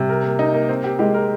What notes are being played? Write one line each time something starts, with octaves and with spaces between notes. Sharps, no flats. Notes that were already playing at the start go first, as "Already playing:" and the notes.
Already playing: C3 G3
A#4
A#3
D#4
A#3
C4
G4
G#3 G4
A#4